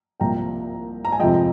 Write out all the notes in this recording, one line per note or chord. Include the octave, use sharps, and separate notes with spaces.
C2 A#2 F3 G5 A#5
A#5
G#5
F2 C3 F3 G#3 D#5 G5